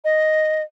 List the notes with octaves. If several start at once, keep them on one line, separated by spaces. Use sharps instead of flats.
D#5